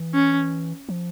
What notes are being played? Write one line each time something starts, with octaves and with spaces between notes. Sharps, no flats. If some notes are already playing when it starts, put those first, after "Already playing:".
Already playing: E3
C#4
F3